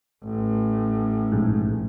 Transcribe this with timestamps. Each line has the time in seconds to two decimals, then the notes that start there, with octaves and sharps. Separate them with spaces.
0.24 A1
1.32 A#1 G#2